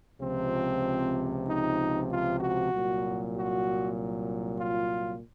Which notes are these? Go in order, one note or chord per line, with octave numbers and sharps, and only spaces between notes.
C#2 C3 F3 C4
D#4
F4
F#4
C2 A#2 F#3
F#4
F4